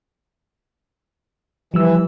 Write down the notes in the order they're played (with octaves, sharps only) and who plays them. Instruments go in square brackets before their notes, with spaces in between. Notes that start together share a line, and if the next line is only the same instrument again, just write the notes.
[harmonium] E3 [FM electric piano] F3 G3 E6